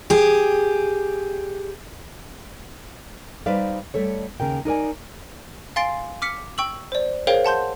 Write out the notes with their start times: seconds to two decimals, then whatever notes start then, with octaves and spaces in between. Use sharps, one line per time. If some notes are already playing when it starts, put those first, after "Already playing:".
0.10 G4 G#4
3.46 G3 D#4 B4 C5 D5 F5
3.94 G3 A3 A4 C#5
4.40 D#2 C#3 A#4 G5
4.65 D#4 A#4 D5 G#5
5.76 F5 G#5 C6 A6 C7 D7
6.22 D6 F6 B6 C#7
6.58 G5 C#6 E6 F#7
6.92 C5 D5
7.27 G#4 A#4 C5 C#5 F5 G5
7.44 F#5 A5 C6 G6